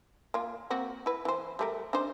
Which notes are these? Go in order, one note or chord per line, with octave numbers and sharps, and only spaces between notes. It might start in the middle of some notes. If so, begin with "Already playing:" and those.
A#3 F4
A#3 C4 F#4
E4 B4
E3 C5
G3 A3 A#4
D4 D#4 C5